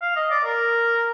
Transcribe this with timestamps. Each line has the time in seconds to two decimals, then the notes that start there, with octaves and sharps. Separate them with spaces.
0.02 F5
0.16 D#5
0.31 D5
0.44 A#4